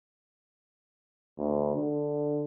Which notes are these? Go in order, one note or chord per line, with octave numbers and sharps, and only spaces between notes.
D2
D3